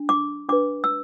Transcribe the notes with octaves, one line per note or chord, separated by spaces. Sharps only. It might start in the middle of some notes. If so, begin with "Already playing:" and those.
Already playing: D4
D6
D4 B4 D6
E6